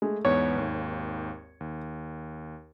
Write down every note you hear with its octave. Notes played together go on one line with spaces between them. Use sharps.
G#3 A3
E2 G#2 B3 C#5
G#1 D#2
D#2